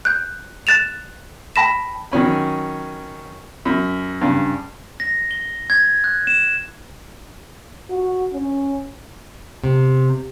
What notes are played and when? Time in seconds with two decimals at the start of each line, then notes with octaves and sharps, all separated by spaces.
0.05 F#6 G6
0.67 F#6 A6 E7 F7
1.56 G5 A5 B5 A#6 B6 E7
2.12 D#3 F#3 C#4 B5
3.65 F#2
4.21 G2 C#3
5.00 A#6
5.31 G7
5.70 G#6
6.04 F#6
6.27 E7
7.90 F#4
8.33 C#4
9.64 C3